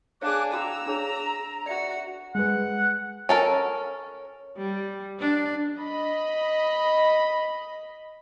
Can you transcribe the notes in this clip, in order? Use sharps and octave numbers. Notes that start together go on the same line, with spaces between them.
D4 G#4 C#5 F5 D6 F#6
F#4 F5 G5 A#5 E6
D4 G#4 C#5
F#4 D5 E5 C#7
G#3 B4 F#5
C#4 A4 A#4
G3
D4
D#5 B5